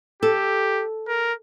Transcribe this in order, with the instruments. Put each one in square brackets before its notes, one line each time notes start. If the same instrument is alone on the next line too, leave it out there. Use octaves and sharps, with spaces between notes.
[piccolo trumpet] G4 [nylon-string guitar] A4
[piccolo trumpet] A#4